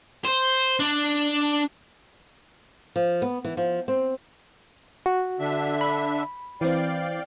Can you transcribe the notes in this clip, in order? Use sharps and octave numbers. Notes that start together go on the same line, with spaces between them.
C5
D4
F3
B3
E3
F3
C4
F#4
D3 D4 E5
B5
E3 C4 D5 F5 G5